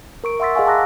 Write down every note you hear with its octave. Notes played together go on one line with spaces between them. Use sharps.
A#4 C#6 D7
E5 F#5 C6 E6 A6 B6
G#4 D#5 F5 F#5 G#5 C#6
A5 A#5 D6 E6 F#6 A#6